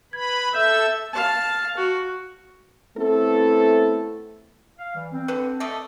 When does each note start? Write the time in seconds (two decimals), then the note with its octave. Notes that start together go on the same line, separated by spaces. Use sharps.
0.13 B4 B5 G#6
0.54 A4 E5 E6 G6 E7
1.13 F5 A5
1.77 F#4
2.97 A3 B3 C4 E4 A4
4.78 F5
4.94 E3 G3
5.12 C4
5.28 D3 B4
5.60 A3 D5 D#5